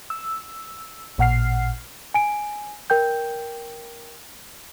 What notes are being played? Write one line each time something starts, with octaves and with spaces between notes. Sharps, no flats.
E6
A1 A#2 F#5 F6 C7
G#5 D7
A#4 G5 G6